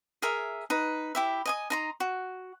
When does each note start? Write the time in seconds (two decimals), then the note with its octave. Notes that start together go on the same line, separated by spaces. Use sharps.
0.22 G#4 A#4 E5
0.70 D#4 B4
1.15 E4 G4 E5
1.46 D#5 G#5 D#6
1.70 D#4 A#5 C6
2.00 F#4